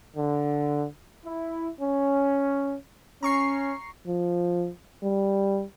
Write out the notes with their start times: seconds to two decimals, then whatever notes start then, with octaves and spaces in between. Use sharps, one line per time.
0.16 D3
1.25 E4
1.80 C#4
3.23 C#4 A#5 C#6 C7
4.07 F3
5.03 G3